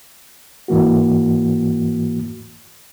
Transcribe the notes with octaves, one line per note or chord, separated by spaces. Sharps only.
G#2 E3 A#3 F#4